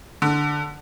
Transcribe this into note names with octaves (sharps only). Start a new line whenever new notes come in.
D3